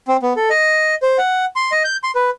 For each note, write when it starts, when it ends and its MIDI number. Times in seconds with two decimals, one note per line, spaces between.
0.08 0.17 60
0.22 0.33 59
0.36 0.49 69
0.50 0.95 75
1.02 1.17 72
1.18 1.45 78
1.56 1.71 84
1.72 1.83 75
1.85 1.97 91
2.04 2.11 84
2.15 2.30 71